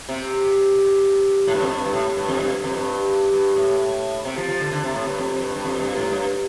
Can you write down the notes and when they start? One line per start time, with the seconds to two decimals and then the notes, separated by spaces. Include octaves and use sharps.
0.09 C3
1.47 A2
1.54 G2
1.62 F2
1.69 G2
1.86 G2
1.93 A2
2.17 G2
2.28 F2
2.40 G2
2.64 F2
2.75 G2
3.33 G2
3.56 A2
4.25 C3
4.37 F3
4.48 F3
4.61 D3
4.72 D3
4.84 C3
4.94 A2
5.07 G2
5.18 F2
5.42 G2
5.56 G2
5.64 F2
5.80 G2
5.96 A2
6.11 G2